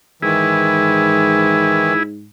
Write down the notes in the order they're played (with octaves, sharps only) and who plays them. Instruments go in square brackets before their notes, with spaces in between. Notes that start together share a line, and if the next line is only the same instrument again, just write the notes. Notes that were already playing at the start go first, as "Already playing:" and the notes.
[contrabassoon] G#2 [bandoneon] D#3 E3 [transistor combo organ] E4 G#4